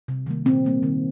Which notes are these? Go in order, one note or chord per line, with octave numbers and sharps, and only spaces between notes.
C3
D#3 G3 A#3
A#2 C4
G3 A#3
D#3